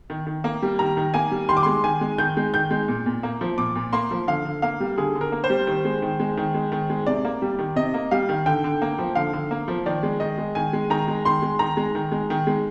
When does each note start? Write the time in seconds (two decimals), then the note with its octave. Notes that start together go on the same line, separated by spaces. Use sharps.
0.10 D#3
0.27 D#3
0.44 A#3
0.62 G3
0.79 D#3 A#5
0.97 D#3
1.14 A#3 G#5
1.31 G3
1.49 D#3 C6
1.57 D6
1.63 G#3 C6
1.84 D#3 G#5
2.01 G#3
2.18 D#3 G6
2.37 G#3
2.54 D#3 G6
2.71 G#3
2.88 A#2
3.06 A#2
3.23 A#3
3.41 F3
3.58 A#2 D6
3.75 A#2
3.93 A#3 C6
4.11 F3
4.28 D3 F5
4.45 D3
4.62 A#3 F5
4.80 G3
4.97 D3 G#4
5.15 D3
5.21 A#4
5.32 A#3
5.44 C5
5.50 G3
5.67 D#3
5.85 G#3
6.02 D#3
6.20 G#3
6.37 D#3
6.54 G#3
6.72 D#3
6.90 G#3
7.06 C3 D5
7.25 A#3
7.42 G3
7.59 D#3
7.76 C3 D#5
7.94 A#3
8.11 G3 F5
8.29 D#3
8.46 D3 G5
8.64 D3
8.82 A#3
8.99 F3
9.15 D3 F5
9.33 D3
9.51 A#3
9.68 F3
9.86 D#3 D5
10.03 G#3
10.20 D#3 D#5
10.38 G#3
10.55 D#3 G#5
10.73 G#3
10.90 D#3 A#5
11.08 G#3
11.25 D#3 C6
11.42 G#3
11.59 D#3 A#5
11.77 G#3
11.95 D#3
12.12 G#3
12.30 D#3
12.47 G#3